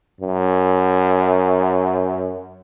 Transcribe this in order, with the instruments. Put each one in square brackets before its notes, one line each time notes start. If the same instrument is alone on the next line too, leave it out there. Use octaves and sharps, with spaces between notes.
[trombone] F#2